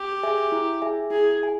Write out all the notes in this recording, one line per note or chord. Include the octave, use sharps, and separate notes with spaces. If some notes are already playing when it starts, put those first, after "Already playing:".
Already playing: G4
G#4 E5 G#5
E4
G#4 E5 G#5
E4 G#4
G#4 E5 G#5